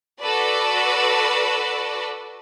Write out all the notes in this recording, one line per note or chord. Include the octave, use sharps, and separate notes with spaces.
F#4 A4 B4 D5